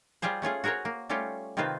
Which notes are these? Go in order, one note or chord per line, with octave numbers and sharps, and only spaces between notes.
G3 F4 G4 G#4 C5
A3 C#4 F4 G#4
F#4 G#4 A#4 C5 C#5
A#3
G3 A3 C#4 F4 G4
C3 D#3 C4 F4 B4 C5